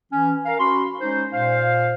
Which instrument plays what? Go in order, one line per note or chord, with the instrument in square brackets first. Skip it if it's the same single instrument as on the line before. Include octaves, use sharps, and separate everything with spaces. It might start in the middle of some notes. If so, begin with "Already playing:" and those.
[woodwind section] E3 C#4
A#4 F5
C#4 F#4 B5 C6
G#3 C#4 D#4 C5
A#2 C5 F5